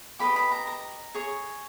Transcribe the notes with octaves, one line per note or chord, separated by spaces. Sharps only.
G4 B4 D#5 B5
B5
A#5
A#5
G#4 C#5